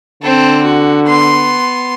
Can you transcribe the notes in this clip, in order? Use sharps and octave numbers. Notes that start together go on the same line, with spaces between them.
D3 C4 A4
F#4
B3 C6